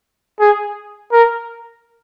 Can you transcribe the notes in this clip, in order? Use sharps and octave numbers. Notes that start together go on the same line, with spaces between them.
G#4
A#4